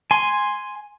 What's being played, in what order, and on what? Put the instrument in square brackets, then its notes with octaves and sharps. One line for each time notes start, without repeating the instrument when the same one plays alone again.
[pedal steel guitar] G#5 C6